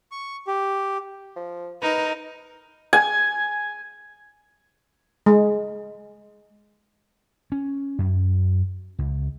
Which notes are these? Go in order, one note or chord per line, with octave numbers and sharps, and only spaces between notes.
C#6
G4
F3
D#4 A#4 B4
G#5
G#3
C#4
F#2
C#2